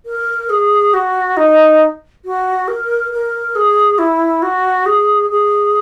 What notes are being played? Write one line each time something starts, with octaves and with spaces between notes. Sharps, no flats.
A#4
G#4
F#4
D#4
F#4
A#4
A#4
G#4
E4
F#4
G#4
G#4